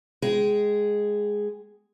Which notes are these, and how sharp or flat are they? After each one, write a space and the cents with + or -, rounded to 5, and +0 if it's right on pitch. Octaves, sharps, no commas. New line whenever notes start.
G#3 +0 G#4 +0 G5 -20